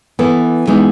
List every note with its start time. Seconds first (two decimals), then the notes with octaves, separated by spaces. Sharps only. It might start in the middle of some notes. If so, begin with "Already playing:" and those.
0.19 E3 B3 E4 A4
0.67 E3 G#3 B3 D#4